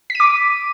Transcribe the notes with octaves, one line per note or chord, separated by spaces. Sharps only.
B6
D#7
D6